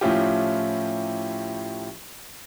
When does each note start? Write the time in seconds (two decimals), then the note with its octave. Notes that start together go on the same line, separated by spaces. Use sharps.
0.01 A2 F3 C#4 E4 F4 G4